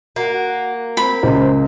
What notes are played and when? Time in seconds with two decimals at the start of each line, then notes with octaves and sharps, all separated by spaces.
0.16 A#3 F#4
0.32 F#4
0.97 C4 B5
1.23 C#2 C5